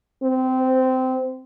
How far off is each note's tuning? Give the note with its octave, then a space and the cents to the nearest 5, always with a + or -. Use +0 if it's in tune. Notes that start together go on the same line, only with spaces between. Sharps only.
C4 -20